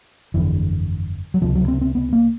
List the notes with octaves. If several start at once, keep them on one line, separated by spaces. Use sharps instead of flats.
G1 F2 D3 E3
F#3
C#2 C3 F3
F#3
C4
C4
B3
A#3